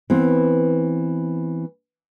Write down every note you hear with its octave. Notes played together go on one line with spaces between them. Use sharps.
E3 B3 C4